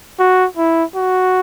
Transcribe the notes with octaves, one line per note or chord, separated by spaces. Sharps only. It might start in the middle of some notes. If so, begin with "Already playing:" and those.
F#4
E4
F#4